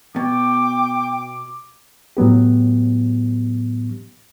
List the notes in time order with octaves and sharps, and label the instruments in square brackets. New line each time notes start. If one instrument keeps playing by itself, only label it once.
[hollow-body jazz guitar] B2 [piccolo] G5 [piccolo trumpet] D6
[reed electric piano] A2 F#3 B3 G4